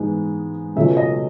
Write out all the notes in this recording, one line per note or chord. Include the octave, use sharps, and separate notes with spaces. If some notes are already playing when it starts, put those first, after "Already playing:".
Already playing: G#2 E3 G#3 B3
C#2 B2 A3 C#4 E5
D#5